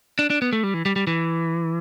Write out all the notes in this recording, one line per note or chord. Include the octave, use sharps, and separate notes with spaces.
D4
D4
B3
A3
G3
E3
G3
G3
E3